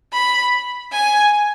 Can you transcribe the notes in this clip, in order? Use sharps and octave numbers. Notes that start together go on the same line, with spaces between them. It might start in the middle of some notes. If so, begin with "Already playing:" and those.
B5
G#5